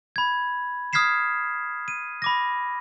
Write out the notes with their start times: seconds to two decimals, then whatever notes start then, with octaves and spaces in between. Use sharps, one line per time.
0.16 B5 G#6
0.93 D#6 F6 G#6 B6 C7 E7
1.88 D#7
2.22 B5 D6 A#6